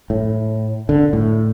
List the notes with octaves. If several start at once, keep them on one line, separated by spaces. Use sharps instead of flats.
A2
D3
A2